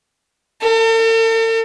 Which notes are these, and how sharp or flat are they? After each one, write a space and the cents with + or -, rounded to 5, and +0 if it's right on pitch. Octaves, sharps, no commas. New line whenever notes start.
A4 +45